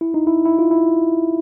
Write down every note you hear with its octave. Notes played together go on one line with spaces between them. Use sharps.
E4
D#4
E4
E4
F4
E4